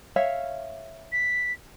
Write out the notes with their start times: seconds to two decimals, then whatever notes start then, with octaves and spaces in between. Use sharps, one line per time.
0.16 C#5 E5 F5
1.12 B6